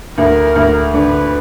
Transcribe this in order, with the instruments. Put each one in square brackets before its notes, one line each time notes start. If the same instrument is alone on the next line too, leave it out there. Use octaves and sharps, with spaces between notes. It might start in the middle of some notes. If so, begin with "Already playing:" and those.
[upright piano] D2 [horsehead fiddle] A#4
[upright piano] D2
[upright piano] D3 [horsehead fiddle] B4